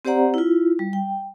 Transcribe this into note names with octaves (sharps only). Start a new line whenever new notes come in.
C4 G4 C5 D5 F#5 A#5
E4 F4
G3
G5